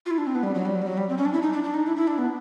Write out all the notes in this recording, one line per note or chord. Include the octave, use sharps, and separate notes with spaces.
F4
E4
D4
C4
B3
G3
F#3
G3
F#3
G3
F#3
G3
C4
C#4
D4
E4
D#4
D4
D4
D#4
E4
E4
D4
B3